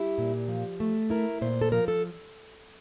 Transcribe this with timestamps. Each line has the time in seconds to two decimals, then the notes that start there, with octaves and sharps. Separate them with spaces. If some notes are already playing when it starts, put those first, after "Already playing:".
Already playing: G3 E4 G4
0.18 A#2
0.48 F3
0.80 A3
1.10 E4 A#4
1.41 A#2 C5
1.61 A4
1.72 F3 A#4
1.88 A4